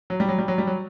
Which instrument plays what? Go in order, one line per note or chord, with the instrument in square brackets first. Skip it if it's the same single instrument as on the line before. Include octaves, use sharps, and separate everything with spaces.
[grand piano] F#3
G3
F#3
G3
F#3
G3
F#3